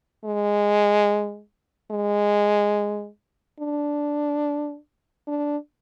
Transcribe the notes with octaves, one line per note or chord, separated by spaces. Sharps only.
G#3
G#3
D4
D4